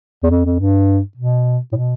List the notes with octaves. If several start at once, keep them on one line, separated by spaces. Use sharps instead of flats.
E2
F2
F2
G2
B2
A2
B2